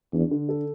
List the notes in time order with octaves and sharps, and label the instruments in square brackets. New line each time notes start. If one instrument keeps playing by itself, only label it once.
[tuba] E2 [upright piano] D4
[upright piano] D3
A4